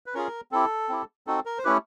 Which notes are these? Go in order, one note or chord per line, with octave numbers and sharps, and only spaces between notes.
B4
C#4 F4 G#4 A#4
C4 E4 G4 A4
C4 E4 G4
C4 D#4 F#4 A4
A#4
C5
A3 C#4 E4 G4 B4